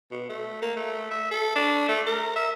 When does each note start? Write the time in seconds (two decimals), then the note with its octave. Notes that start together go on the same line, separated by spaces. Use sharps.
0.11 B2
0.29 A3
0.62 A#3
0.76 A3
1.11 E5
1.31 A4
1.55 D4
1.88 A3
2.06 A#4
2.36 E5